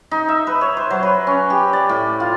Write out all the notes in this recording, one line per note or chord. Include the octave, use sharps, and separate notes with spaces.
D#4
E5
B4
C#5
C5
F#3
B4
C#4
G4
D5
A2
F4